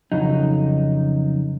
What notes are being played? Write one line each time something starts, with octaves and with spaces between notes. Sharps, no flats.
F2 C#3 F#3 D#4